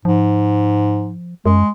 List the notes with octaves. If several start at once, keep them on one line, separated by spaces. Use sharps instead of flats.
G#2 F3
F#2 G#3